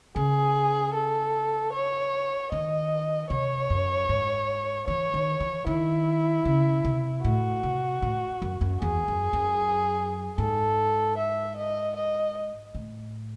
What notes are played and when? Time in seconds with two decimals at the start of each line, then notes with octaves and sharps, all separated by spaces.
0.16 C#3 G#4
0.94 A4
1.73 C#5
2.52 D#3 D#5
3.30 C3 C#5
3.70 F#2
4.09 G#2
4.88 E3 C#5
5.14 D#3
5.40 E3
5.67 D#3 E4
6.45 C#3
6.85 C3
7.24 A2 F#4
7.63 C3
8.02 A2
8.42 F#2
8.61 F#2
8.81 E2 G#4
9.08 F#2
9.33 F#2
10.38 G#2 A4
11.18 E5
11.57 D#5
11.96 D#5
12.75 A2